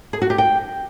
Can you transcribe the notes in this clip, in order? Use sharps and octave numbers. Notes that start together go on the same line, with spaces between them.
G#4
F#4
G4
G5